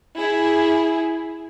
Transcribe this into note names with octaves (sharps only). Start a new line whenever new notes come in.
E4 G#4